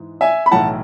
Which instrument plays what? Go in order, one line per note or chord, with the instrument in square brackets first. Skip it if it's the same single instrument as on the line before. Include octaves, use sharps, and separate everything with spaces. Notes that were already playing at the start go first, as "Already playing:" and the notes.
Already playing: [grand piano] G#2 E3 G#3
E5 G#5
B5
B1 A2 E3 F#5 A5